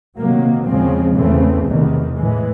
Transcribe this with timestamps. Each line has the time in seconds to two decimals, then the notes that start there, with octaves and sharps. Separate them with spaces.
0.17 C3 D#3 F#3 A#3
0.66 E2 C#3 F3 G#3 C4
1.16 E2 C#3 E3 A3 C4
1.66 E2 C3 D#3
2.16 A2 E3 G#3